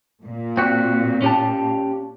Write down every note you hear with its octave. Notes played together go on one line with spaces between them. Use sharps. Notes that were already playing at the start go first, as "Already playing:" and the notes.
A#2
C4 F#4
C#4 G4 A5